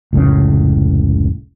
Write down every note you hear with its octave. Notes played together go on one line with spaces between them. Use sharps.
F1 C#2 A2 C#3